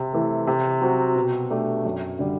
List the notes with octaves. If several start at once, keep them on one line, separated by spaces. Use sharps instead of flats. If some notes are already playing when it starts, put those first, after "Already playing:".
Already playing: C3
E3 A3
C3
F#3 C4 F#4
B2
A3 D4 G4
F#2
D3 G3